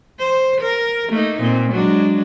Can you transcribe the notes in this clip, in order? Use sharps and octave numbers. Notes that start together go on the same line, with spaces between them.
C5
A#4
A3 A#3 D#4
A#2 C4
F#3 G#3 D4